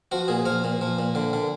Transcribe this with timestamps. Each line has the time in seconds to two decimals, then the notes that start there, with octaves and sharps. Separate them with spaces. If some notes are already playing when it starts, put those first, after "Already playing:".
0.12 F3 F#4
0.28 A#2 G#4
0.45 F3 F5
0.64 A#2
0.81 F3
0.99 A#2
1.15 D3
1.33 D3